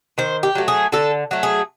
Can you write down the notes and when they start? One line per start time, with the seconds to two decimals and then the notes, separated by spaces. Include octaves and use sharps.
0.18 D#3 C5
0.43 G4
0.55 F#3 A3
0.68 G#4
0.92 D3 A4
1.31 F#3 A3
1.43 G#4